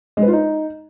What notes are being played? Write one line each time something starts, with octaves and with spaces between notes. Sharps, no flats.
G#3
B4
F4
D#4